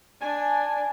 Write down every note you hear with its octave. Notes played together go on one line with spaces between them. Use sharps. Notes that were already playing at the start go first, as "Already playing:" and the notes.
D4 G#5